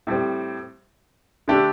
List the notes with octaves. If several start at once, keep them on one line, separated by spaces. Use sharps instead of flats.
A2 G3 C4
D3 A3 D4 G4